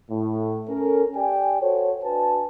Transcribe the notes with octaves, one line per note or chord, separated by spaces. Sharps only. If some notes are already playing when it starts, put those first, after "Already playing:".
A2
C#4 A4 A#4
G4 D5 G5 G#5
F#4 A4 C5 C#5
D4 F#4 B4 G#5 A5